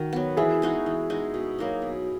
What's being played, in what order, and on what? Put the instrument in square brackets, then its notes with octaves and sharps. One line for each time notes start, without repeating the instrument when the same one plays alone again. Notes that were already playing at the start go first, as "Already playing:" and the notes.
Already playing: [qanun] D#3 [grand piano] F#4 A#4
[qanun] F#3 B3
[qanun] E3 [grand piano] E4 G#4
[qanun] G#3 D#4 F#4
E3
G#3 D#4 F#4
B2
F#3 A#3 D#4
B2